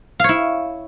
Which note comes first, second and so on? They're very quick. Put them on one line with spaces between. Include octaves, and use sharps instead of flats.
F5 C#5 E4